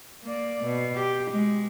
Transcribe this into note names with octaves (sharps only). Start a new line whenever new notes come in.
A#3 D5
B2
G4
G#3